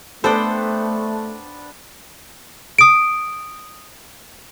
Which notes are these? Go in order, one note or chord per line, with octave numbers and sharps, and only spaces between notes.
A3 B3 D4 A4 C5 G5 A5 B5
D#6 D7